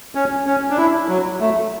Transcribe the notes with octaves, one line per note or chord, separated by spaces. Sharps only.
C#4
C#4
D4
E4
F#3
A3